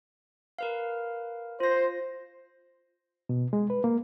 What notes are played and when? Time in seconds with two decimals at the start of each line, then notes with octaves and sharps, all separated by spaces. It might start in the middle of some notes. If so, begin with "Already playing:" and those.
0.59 A#4 B4 F5
1.60 F4 C5 A#6
3.29 B2
3.53 G#3
3.70 B4
3.84 A#3